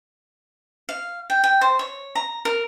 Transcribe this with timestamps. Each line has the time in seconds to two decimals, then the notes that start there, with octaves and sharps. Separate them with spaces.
0.89 F5
1.30 G5
1.44 G5
1.61 C5
1.79 C#5
2.15 A#5
2.45 A#4